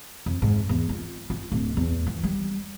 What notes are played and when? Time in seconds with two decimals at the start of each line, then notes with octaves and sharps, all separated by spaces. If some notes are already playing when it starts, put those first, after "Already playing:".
0.26 F2
0.42 G#2
0.69 E2
0.89 F4
1.30 F4
1.52 D1
1.77 E2
2.07 E3
2.24 G3